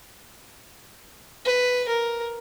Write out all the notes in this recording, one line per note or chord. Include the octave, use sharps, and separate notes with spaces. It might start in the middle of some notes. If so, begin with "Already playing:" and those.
B4
A#4